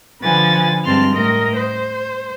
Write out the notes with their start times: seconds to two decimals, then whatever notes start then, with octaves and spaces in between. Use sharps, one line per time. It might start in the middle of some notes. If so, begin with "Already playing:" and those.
0.22 D3 F3 B4 G#5 A6
0.84 G2 G#3 C4 A5 C6 F6
1.14 A2 A#4 D#5
1.56 C5